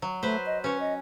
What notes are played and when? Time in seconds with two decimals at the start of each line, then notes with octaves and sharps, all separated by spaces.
0.02 F#3
0.23 A3 B4 C5
0.46 D#5
0.64 C#4 B4 C#5
0.80 D#5